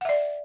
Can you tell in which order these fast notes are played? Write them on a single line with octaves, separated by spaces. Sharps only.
F#5 E5 D5